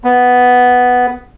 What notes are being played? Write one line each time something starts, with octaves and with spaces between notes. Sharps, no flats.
B3